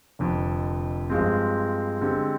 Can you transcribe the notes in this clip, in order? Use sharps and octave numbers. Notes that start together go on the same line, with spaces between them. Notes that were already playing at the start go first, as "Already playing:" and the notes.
F1 F2 D3
G2 F3 G#3 C4
D3 G#3 C4 G4